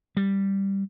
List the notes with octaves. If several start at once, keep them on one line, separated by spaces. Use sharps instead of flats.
G3